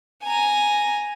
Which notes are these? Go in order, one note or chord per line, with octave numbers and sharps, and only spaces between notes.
G#5 A#5